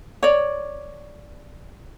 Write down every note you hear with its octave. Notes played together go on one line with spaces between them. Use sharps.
C#5 D5